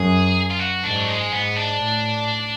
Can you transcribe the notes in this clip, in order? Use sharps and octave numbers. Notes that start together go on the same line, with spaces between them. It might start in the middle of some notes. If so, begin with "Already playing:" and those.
Already playing: F#2 G#4
F4
F#4
G#2 D4
F#3
G#3
G#2 B3
D4
A2